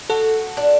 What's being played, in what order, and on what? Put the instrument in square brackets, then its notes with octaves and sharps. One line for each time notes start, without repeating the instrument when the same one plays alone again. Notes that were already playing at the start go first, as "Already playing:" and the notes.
[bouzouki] F#4 [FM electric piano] A4
[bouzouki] D4